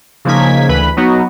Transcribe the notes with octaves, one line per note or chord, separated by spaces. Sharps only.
C#3 F3 A#3 D#4 G#6 B6
D2 E3 B4 B5
F#3 B3 D#4 F#4